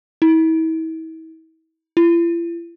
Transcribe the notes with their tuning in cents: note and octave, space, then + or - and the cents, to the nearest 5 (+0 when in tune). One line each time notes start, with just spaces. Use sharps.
E4 -40
E4 +45